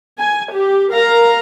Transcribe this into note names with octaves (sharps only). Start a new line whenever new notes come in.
G#5
G4
A#4 F5 A#5